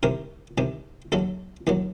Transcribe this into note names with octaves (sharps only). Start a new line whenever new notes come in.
C2 C3 D#3 A#4
C2 C3 D#3
D#2 D#3 F#3 A4
D#2 D#3 F#3